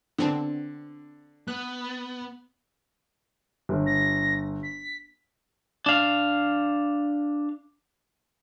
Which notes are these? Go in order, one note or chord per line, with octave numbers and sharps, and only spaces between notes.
D3 B3 C4 D4
B3 F#6
G1
A#6
B6
D4 F5